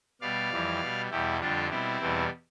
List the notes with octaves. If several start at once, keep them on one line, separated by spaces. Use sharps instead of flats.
B2 G3 D5 F5
F2 E3 G3
B2 G3
E2 B2 G3 E4 G4
F2 D3 G3 D4 F4
B2 G3 C4 E4
E2 B2 G3